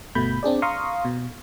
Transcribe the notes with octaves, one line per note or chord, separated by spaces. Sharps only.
G1 B2 A3 B5 G6
C4 D4 G#4 D5
F5 A#5 C6 C#6 D#6
B2